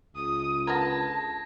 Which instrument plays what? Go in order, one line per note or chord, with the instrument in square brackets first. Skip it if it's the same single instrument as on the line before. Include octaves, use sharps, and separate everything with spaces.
[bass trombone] C#2 [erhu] D#6
[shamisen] D3 B3 A#4 [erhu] A5 [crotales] G#6 A#6